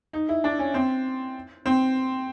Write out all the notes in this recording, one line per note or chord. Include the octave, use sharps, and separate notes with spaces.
D#4
E4
D4
C#4
C4
C4